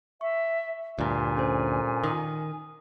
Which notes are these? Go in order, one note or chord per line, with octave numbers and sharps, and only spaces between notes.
E5 C#6
D2 G2 A#2 G#5
C#4 A4 C5
D#3 D#6